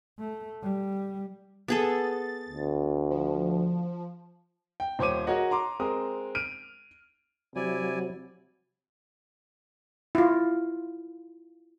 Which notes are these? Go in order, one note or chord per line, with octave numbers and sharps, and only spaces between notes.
A3
G3
B3 G#4 A4 A6
D2
F3
G5
D#1 C5 C#5 D6 D#7
F#4 G#4 A#4 C#5 D#5 F#5
A#5 C6 D6
G#3 C4 A#4 D#6
F6 D7 D#7
C3 F#3 E4 D5 G#5
E4 F4